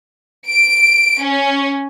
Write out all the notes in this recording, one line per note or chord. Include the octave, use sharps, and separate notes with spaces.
D7
C#4